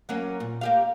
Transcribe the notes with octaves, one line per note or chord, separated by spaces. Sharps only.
F#3 A#3 C#4
A#2
A#3 G4 F5